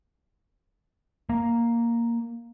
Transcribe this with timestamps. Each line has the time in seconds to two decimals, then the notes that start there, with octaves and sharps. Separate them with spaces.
1.29 A#3